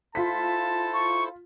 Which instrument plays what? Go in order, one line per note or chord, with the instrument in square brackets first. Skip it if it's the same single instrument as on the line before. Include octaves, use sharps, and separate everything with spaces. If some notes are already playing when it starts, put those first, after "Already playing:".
[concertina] E4 A4 C5 [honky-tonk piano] F4 B6 [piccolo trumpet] A5
[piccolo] C#6